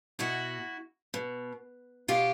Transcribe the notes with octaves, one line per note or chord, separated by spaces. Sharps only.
B2 E4 F#4
B2
B2 F4 G4